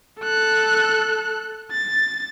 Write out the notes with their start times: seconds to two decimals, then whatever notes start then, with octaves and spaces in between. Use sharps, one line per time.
0.20 A4 F#6
1.72 A6